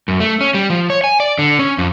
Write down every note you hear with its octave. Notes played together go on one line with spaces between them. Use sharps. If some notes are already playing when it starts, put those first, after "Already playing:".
F#2
A3
C#4
G3
F3
C#5
G#5
D5
D3
C#4
F2